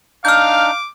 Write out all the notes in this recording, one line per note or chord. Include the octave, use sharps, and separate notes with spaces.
D4 D#4 F5 D6 F6 G6